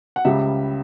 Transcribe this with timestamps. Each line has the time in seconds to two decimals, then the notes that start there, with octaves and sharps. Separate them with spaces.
0.16 F#5
0.25 C#2 C#3 G3 E5